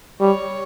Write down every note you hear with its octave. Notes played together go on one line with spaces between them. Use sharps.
G3 C#5